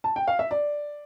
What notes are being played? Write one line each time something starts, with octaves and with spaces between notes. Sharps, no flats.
A5
G5
F5
E5
D5